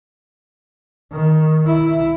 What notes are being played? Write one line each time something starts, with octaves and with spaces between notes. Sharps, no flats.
D#3
E4